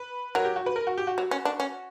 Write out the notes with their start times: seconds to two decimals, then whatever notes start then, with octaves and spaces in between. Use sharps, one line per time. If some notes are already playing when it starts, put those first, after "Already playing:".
Already playing: B4
0.35 F#3 A#4
0.45 G4
0.56 F#4
0.66 B4
0.76 A#4
0.87 F#4
0.98 G4
1.07 F#4
1.18 F#3
1.31 C#4
1.45 D4
1.60 C#4